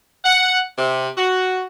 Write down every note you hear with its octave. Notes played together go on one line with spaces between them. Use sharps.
F#5
C3
F#4